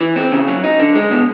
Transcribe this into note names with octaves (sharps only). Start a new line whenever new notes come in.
E3
C4
C#3
F#3
D#4
D3
G#3
B2